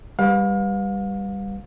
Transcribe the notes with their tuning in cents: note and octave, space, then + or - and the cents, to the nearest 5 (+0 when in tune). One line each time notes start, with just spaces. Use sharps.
G3 +15 B4 +0 F5 +35